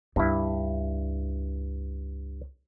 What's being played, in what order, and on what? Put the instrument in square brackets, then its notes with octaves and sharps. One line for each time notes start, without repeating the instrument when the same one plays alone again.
[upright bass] C#2 [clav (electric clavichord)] G2 E4